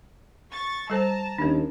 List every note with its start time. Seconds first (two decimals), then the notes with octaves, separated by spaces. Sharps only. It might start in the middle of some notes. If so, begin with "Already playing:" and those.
0.51 C#6 A6
0.90 G3 A4 C5 A5 A#5
1.38 D#2 C#4 D4